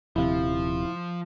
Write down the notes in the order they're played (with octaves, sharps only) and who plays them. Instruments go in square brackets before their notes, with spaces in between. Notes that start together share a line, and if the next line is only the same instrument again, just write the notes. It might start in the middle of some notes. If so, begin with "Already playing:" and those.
[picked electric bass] D#1 C3 [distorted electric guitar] F3 [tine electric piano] E4 F5